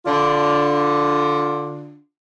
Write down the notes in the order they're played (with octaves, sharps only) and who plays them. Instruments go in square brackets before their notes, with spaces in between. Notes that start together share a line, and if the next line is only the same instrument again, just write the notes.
[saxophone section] D3 D4 F4